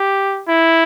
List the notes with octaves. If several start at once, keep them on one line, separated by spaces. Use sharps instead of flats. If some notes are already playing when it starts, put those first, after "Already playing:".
Already playing: G4
E4